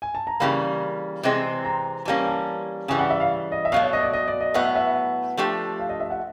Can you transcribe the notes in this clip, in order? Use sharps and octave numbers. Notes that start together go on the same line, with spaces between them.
G#5
A5
A#5
C#3 E3 G3 A#3 B5
C3 E3 G#3 C4
A#5
E3 G3 A#3 C#4 A5
A5
C#3 E3 G3 G#5
F#5
E5
F5
D#5
E5
B2 F#3 A3 F5
C#5
D#5
D5
D#5
D5
D#5
A2 F#3 B3 E5
E5
F3 A3 D4 G4
F5
D#5
E5
F#5